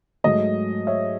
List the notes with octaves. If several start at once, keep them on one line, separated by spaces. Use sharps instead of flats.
G#2 F#3 A3 D#5
C#5 E5